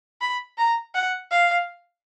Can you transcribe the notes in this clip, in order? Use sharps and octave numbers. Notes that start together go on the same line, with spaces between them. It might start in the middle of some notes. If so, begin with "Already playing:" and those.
B5
A#5
F#5
F5